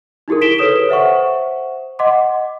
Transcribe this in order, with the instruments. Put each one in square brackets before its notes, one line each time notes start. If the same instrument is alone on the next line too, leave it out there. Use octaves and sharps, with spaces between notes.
[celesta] D#4 E4 G4 G#4 A#4
B6 D7 E7 G7
A4 B4 C#5 D#6 E7
C5 E5 F#5 C#6
D#5 F#5 C6 D6